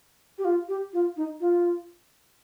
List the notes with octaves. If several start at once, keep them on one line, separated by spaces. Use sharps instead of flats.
G4
F4
G4
F4
D#4
F4